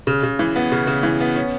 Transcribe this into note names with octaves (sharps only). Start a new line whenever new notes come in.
C#3
C#3
E3
B3
C#3
C#3
E3
B3
C#4